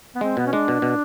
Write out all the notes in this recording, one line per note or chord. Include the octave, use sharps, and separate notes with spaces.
B3
G#3 C4
B2 B3
C#4
G#3 D4
B2
B2